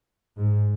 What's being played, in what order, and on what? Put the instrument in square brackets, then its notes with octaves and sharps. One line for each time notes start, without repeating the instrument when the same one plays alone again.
[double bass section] G#2